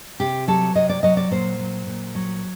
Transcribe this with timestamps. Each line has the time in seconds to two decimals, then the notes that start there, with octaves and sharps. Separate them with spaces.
0.20 C3 G4
0.48 F#3 A4
0.75 C3 D#5
0.89 D5
1.03 F#3 D#5
1.17 D5
1.31 A#2 C5
1.59 F#3
1.86 A#2
2.15 F#3